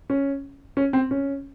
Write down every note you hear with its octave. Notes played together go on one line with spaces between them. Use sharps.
C#4
C#4
C4
C#4